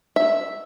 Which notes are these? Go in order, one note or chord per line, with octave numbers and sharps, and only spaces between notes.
E5